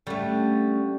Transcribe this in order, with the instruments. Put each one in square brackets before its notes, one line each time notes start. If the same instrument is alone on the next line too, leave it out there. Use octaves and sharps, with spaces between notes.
[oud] D3 A3 [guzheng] G3 [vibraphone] C#4 C#6